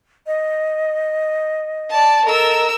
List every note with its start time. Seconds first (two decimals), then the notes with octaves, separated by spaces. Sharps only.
0.26 D#5
1.90 D5 A5
2.26 A4 A#4 D#5 A#5 E6